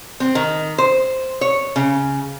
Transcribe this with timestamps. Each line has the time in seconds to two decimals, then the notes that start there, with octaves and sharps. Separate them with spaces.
0.20 C4
0.35 D#3
0.78 C5
1.41 C#5
1.76 C#3